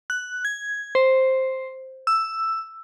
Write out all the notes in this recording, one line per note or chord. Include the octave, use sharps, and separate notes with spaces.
F#6
G#6
C5
E6